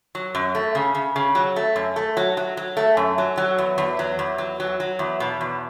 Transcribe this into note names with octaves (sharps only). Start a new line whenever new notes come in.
F#3
F#2
A3
C#3
C#3
C#3
F#3
A3
F#2
A3
F#3
F#3
F#3
A3
F#2
F#3
F#3
E2
E2
F#3
E2
F#3
F#3
F#3
E2
B2
E2